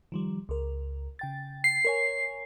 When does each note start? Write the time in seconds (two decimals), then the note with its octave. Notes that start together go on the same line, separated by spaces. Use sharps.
0.12 D#3 F3 G3
0.49 C#2 A#4
1.19 C#3 G5 A6
1.64 C7
1.85 A#4 C#5 G#5